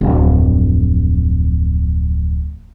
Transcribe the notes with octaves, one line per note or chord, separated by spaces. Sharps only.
D1 F2